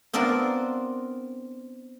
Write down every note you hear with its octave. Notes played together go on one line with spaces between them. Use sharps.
B3 C4 D4 F4 A#4